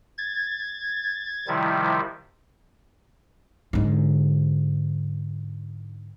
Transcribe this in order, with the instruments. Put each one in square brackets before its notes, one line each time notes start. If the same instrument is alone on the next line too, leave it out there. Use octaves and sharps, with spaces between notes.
[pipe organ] G#6 A6
C3 D#3 F3 G3 E4
[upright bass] G#2 D3